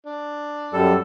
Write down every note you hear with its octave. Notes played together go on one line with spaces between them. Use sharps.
D4
F#2 G3 A4